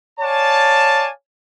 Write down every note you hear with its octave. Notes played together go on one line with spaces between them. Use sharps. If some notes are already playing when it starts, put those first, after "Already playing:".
C#5 D5 F5 G#5 A5